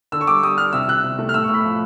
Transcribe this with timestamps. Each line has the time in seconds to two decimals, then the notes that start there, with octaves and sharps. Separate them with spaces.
0.12 D3 E6
0.21 C#6
0.27 G3 D6
0.42 G3 D#6
0.58 G3 F6
0.73 C3 E6
0.88 C3 F#6
1.04 C3
1.19 A3
1.29 F6
1.34 A2 E6
1.44 C#6
1.49 A2 B5
1.64 F3